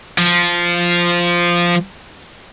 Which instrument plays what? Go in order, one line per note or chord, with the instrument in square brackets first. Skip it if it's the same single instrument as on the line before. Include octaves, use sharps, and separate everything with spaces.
[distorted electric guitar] F3